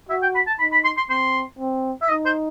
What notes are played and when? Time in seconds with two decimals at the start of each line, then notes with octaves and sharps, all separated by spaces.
0.09 F#4 E5
0.22 G5
0.35 B5
0.47 A5
0.59 D#4 B5
0.72 B5
0.84 C6
0.97 C6
1.09 C4 C6
1.59 C4
2.02 E5
2.09 D#4 D#5
2.26 C5